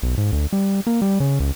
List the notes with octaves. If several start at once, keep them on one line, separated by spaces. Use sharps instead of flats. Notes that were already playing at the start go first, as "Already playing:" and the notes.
B1
G#2
D2
G3
A#3
G3
C#3
C#2